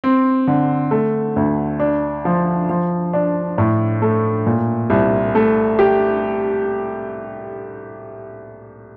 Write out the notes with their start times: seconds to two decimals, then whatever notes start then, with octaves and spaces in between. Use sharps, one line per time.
0.04 C4
0.48 D3
0.91 A3
1.36 D2
1.80 D4
2.25 F3
2.69 F3
3.13 D4
3.58 A2
4.02 A3
4.47 A#2
4.90 C2
5.35 A3
5.79 G4